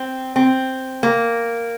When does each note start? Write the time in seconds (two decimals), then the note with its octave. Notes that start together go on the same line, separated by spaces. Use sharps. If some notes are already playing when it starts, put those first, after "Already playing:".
Already playing: C4
0.36 C4
1.03 A#3